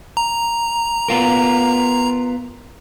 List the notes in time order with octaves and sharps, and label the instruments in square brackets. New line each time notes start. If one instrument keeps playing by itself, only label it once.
[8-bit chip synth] A#5
[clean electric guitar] B3 F4 A#4